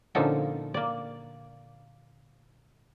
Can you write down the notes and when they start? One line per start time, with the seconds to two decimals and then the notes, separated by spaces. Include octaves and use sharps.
0.15 A#2 D3 F3 C#4 D#4 A4
0.74 A#3 D5